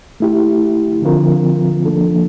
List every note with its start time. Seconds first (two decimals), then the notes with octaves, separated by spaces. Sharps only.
0.20 A3 E4 G4
1.02 D3 F3 C4 F4 A#4
1.85 F3 A#3 D4 A4